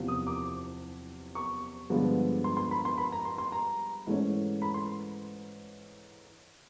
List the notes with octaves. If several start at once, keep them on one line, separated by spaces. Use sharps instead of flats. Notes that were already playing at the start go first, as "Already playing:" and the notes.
Already playing: F#1 E2 C3 F3
D#6
D6
C#6
G2 D3 F3 G#3 B3
C6
C6
B5
C6
B5
A#5
C6
C6
A#5
G#2 E3 A3 C#4
B5
C6